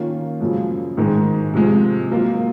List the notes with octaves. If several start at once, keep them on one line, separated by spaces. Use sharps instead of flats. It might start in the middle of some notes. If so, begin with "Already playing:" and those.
Already playing: D#3 A#3 C#4 F4
F#2 C#3 F3 G#3
G#2 D#3 G#3
C3 F3 G#3
F#3 A#3 F4